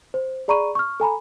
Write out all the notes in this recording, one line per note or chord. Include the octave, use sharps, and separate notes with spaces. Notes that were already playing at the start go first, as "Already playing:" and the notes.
C5
G#4 D5 A#5 B5 C#6 D#7
C#6 F6
A4 G#5 A#5 B5